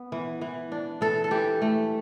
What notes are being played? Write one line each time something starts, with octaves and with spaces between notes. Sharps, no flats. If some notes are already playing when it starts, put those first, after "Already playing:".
Already playing: B3
E3
E3
D4
E3 A4
A4
E3 G4
A3